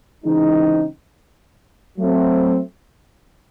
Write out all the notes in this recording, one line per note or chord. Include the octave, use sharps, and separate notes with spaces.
C#3 E3 G#3 C4 D#4
F#3 A3 C4